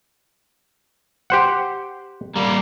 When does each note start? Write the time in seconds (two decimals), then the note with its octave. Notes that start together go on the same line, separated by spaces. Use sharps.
1.30 G4 C5 F#5
2.36 G3 A#3